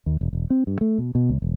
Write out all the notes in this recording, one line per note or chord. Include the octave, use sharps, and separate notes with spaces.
D#2
E1
E1
C4
G2
A3
B2
B2
C#2
E1